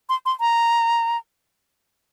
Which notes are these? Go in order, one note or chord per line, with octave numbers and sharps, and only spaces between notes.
C6
C6
A#5